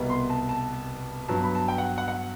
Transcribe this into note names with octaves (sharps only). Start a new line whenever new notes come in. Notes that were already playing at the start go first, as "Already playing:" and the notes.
Already playing: C2 B2 G3 B3
C6
A5
A5
G2 F#3 B3 A5
B5
A5
G5
F#5
F#5
F#5